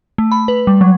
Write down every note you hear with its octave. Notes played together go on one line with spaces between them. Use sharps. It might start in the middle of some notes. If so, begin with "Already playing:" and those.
A3
B5
B4
G3
F#3